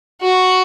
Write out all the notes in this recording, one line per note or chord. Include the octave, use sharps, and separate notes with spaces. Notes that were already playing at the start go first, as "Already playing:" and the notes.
F#4